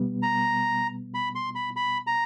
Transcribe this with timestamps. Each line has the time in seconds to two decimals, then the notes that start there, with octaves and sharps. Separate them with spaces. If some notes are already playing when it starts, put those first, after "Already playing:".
Already playing: B2 G3 B3
0.22 A#5
1.14 B5
1.35 C6
1.55 B5
1.76 B5
2.07 A#5